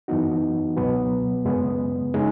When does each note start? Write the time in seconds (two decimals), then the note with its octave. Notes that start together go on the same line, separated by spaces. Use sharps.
0.08 F#2 E3 B3 D#4 F#4
0.77 C#2 B2 F#3 B3
1.45 F#2 C#3 G#3 B3
2.14 C#3 G#3 D#4